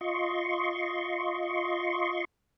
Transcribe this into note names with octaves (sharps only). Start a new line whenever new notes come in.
F4 D#5 C6 C#6